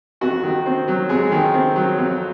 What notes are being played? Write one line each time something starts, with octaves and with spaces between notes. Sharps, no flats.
F2 F#4
D#3
C4
F#3
F2 G#3 G#4
D#3
C4
F#3
F2